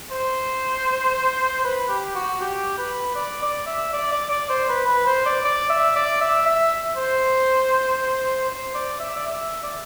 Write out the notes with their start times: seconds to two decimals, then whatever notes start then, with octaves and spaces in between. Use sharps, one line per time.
0.11 C5
1.64 B4
1.89 G4
2.15 F#4
2.40 G4
2.78 B4
3.16 D5
3.42 D5
3.66 E5
3.93 D5
4.12 D5
4.31 D5
4.49 C5
4.69 B4
4.87 B4
5.06 C5
5.26 D5
5.45 D5
5.70 E5
5.96 D5
6.21 E5
6.46 E5
6.97 C5
8.50 C5
8.75 D5
9.00 E5
9.16 D5
9.26 E5
9.63 D5